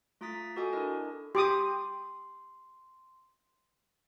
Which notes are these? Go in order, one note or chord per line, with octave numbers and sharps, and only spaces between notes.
A3 F4 A#5 D#6 A6 B6
F#4 A4 D#5 G#5 D6 D#6
D4 E4 A4 A#4 D#5
G4 C6 D6 D#6